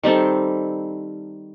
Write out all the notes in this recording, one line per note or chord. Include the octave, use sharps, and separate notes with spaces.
D#3 G3 C4 A4